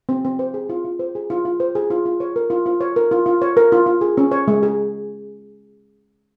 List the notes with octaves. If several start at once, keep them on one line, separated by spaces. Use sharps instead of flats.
C4
C4
C5
G#4
F4
F4
C5
G#4
F4
F4
C5
G#4
F4
F4
C#5
A#4
F4
F4
C#5
A#4
F4
F4
C#5
A#4
F4
F4
G#4
C#4
C#5
G#3
G#4